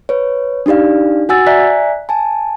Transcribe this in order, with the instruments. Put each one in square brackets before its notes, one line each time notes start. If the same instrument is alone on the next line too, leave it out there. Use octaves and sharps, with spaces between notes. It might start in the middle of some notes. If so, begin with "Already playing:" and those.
[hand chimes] B4 C#5
D4 D#4 G4 D5 F5
F#4 F#5 G#5 E6 A6
D5 E5 G#5 A#5 F#6 B6
G#5 A5